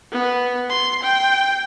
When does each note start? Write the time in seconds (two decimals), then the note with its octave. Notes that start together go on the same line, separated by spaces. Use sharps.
0.11 B3
0.70 C6
1.02 G5